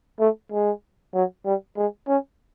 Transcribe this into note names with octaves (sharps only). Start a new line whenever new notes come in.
A3
G#3
F#3
G3
G#3
C#4